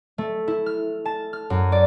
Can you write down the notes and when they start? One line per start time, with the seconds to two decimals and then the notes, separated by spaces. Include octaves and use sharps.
0.18 A3
0.48 E4
0.66 F6
1.05 A5
1.33 F6
1.50 F#2
1.72 D5